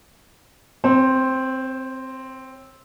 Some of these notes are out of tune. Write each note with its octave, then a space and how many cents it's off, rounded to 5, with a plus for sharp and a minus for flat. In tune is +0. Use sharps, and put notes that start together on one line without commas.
C4 +0 C#5 -40